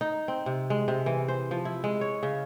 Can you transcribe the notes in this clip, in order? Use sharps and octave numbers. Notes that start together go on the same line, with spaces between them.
D#4
C4
C3
G#3
C3
E3
C5
F3
E4
G#3
C#5
C#3